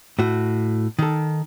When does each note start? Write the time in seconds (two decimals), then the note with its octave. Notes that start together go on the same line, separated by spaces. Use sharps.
0.19 A2 F#4
0.99 D#3 A4